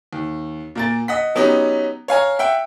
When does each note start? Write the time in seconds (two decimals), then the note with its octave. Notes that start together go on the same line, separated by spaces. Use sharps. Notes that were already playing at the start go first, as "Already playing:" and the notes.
0.13 D#2
0.75 A#2 A#3 A6
1.08 D#5 F#5 B6
1.35 F#3 B3 C#4 D#4 G4
2.08 C#5 F5 G#5 A#5
2.39 E5 F#5 G5